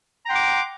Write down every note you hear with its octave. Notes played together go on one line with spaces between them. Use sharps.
F#5 G5 A#5 C6 D6